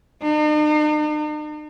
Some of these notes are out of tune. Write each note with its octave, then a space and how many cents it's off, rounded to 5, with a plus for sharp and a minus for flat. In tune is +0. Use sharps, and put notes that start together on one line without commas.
D#4 -45